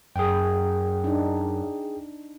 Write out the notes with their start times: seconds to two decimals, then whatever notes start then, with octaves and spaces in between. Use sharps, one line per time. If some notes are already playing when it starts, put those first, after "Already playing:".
0.16 F#2 G#4 G5
1.04 D4 D#4